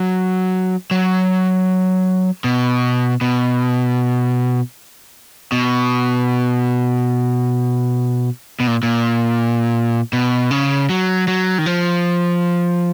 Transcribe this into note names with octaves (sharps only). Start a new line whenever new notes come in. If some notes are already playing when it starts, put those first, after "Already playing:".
Already playing: F#3
F#3
B2
B2
B2
B2
A#2
A#2
B2
C#3
F#3
F#3
D#3
F3